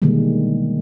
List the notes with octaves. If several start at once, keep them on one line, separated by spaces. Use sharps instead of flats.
B2 D3 D#3 G3 G#3 A#3